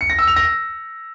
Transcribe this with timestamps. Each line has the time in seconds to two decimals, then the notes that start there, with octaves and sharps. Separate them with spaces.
0.01 C#7
0.10 A#6
0.19 E6
0.28 F7
0.36 A#6